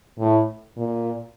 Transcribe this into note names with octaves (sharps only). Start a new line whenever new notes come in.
A2
A#2